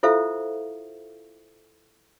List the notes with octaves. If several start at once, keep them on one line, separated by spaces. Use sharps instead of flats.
E4 F4 A4 C5 E5 F5